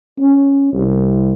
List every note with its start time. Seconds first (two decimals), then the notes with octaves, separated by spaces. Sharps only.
0.19 C#4
0.73 C2